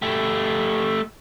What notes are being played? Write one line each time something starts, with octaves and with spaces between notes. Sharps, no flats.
A3 G4